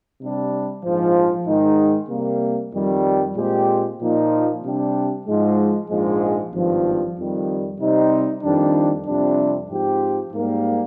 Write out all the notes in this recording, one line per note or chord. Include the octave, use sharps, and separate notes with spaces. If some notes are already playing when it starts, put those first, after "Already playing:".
C3 G3 D4
A#1 G#2 F3
G#2 D#3 G#3 D#4
C3 G3 A#3
F2 D#3 G3
A#2 G#3 C4 G4
A#2 F3 A#3 D#4
C3 G3 D4 G4
G#2 F3 G#3
A#1 G#2 F3 G#3
G#1 G2 F3
F2 D#3 G3
C3 G3 C4 D#4
F2 D#3 G3 D4
F2 C3 G3 D4
G#2 F3 C4 G4
G#2 G3 A#3